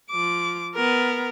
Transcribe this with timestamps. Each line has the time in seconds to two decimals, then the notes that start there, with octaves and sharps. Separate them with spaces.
0.11 F3 D6
0.75 B3 A#4